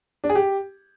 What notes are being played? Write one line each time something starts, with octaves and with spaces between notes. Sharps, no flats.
D4
G#4
G4